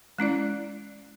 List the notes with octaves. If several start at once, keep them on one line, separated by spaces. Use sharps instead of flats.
G#3 C#4 E4 D5